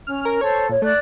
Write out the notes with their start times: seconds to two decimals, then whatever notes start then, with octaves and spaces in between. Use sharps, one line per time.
0.07 C#4 F6
0.25 A#4
0.41 A4 C5 C#5
0.69 A#2 C#5
0.82 A3 D5 F#6